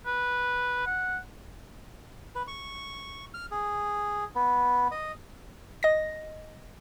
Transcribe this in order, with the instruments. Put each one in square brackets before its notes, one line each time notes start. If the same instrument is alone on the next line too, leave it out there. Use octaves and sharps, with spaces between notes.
[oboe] B4
F#5
[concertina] B4
C#6
F6
G#4
B3
D#5
[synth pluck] D#5 A#6